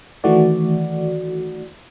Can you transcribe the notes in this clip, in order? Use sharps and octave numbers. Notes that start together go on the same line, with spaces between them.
D#3 E3 A3 F#4 D5